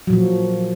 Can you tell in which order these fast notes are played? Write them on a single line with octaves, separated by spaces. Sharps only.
F#3 A#2 F3